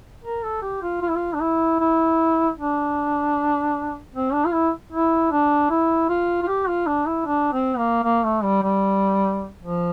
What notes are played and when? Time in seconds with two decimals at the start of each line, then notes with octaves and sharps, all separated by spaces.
0.24 A#4
0.43 A4
0.62 G4
0.82 F4
1.02 F4
1.09 E4
1.15 F4
1.34 D4
1.41 E4
1.80 E4
2.58 D4
4.14 C4
4.33 D4
4.45 F4
4.52 E4
4.92 E4
5.31 D4
5.70 E4
6.09 F4
6.42 F4
6.48 G4
6.68 F4
6.87 D4
7.06 E4
7.26 D4
7.53 C4
7.78 A#3
8.04 A#3
8.24 A3
8.43 G3
8.63 G3
9.61 F3